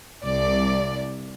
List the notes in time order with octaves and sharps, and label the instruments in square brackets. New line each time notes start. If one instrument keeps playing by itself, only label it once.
[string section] C2 D5